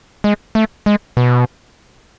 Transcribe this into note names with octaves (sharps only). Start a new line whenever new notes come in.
G#3
A3
G#3
B2